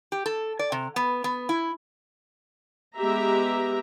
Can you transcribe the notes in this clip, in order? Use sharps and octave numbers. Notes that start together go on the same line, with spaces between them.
G4
A4
D5
C3
B3
B3
E4
G#3 B3 G4 E5 A#5